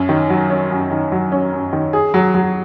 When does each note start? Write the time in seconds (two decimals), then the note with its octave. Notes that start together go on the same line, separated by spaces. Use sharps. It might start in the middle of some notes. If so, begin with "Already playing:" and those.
Already playing: F#2 C#4
0.09 D#3
0.30 F#3
0.50 C#4
0.71 F#2
0.91 D#3
1.12 F#3
1.32 C#4
1.52 F#2
1.73 D#3
1.93 G#4
2.14 F#3
2.34 F#3